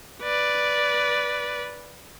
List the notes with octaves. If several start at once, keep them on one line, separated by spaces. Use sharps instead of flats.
B4 D5